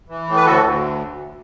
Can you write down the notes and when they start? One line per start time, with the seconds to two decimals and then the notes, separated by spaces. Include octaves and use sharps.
0.09 E3
0.27 A2
0.36 B4
0.45 D2 F#4 A4
0.64 D2